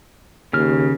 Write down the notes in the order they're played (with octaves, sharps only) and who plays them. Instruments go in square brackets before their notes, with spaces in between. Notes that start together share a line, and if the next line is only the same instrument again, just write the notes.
[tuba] D#2 [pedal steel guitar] C#3 F6